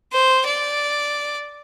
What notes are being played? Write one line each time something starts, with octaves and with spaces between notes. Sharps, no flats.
C5
D5